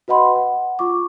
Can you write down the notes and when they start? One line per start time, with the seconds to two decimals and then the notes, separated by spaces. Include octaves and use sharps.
0.08 F#4 B4 D#5 F#5 B5 C6
0.36 F#5
0.79 F4 C#6 D6